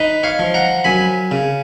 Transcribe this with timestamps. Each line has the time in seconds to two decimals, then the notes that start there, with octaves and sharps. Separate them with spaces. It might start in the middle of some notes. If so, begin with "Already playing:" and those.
Already playing: D#4 B4 D#5
0.23 C#5 F5
0.39 F3
0.54 F#5 A#5
0.84 F#2 G#5 B5
1.31 C#3